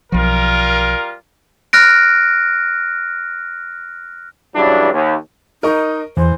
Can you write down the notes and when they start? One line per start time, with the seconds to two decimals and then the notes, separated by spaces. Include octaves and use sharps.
0.12 B1 F3 G3 F4 A#4
1.73 F6 F#6 A#6 D7
4.56 G2 C#3 E3 F#3 G3 D4
4.93 D#2
5.63 D#4 A#4 D#5 C#6
6.17 E2 E3 C5